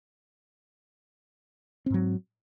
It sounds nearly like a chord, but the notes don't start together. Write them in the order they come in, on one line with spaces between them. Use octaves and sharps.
C4 G#2 F#3